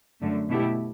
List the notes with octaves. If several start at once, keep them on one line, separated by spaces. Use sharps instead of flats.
F#2 D3 A3
B2 A3 E4 G4